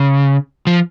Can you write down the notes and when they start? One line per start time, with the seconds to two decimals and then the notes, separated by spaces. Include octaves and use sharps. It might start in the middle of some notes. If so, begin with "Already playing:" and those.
Already playing: C#3
0.67 F3